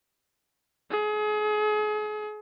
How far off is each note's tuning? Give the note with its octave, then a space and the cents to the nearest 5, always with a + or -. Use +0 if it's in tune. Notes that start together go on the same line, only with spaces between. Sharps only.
G#4 +35